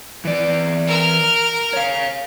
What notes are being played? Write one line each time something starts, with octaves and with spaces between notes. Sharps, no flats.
E3 D5
A#4 F6
C#5 F5